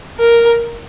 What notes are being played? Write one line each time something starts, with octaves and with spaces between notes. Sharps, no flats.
A#4